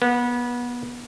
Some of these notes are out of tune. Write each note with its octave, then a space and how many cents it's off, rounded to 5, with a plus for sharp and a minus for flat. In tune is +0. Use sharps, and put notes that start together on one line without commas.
B3 -25